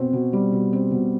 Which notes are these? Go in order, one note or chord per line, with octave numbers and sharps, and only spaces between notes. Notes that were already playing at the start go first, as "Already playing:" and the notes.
Already playing: B2 C4
B2
G3
B2
C4
B2